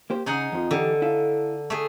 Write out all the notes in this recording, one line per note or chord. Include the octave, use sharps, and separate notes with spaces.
A#3 G4 C5
C#3 D#4 G#4 F#5
F2 F3
D3 E3 G4 A4
E4 A4 F5
A3 G#4